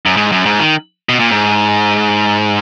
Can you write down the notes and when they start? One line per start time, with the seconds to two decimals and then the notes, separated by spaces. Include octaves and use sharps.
0.06 F#2
0.17 G#2
0.32 F#2
0.46 G#2
0.60 D#3
1.09 B2
1.19 A#2
1.31 G#2